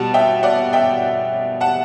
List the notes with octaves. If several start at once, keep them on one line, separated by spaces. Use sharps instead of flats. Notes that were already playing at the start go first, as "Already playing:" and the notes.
Already playing: B2 G3 F#5 A5
E5 G5
D5 F#5
E5 G5
F#5 A5